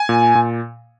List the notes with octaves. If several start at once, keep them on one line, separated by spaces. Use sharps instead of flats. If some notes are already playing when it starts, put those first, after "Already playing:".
Already playing: G#5
A#2
A#2